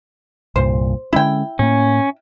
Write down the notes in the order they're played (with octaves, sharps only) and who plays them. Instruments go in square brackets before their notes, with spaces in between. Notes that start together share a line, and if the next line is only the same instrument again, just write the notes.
[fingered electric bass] C2 G2 A#2 [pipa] C5
[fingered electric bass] D3 G#3 C#4 [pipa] E4 G5
[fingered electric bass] A2 A#3 [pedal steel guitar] C#4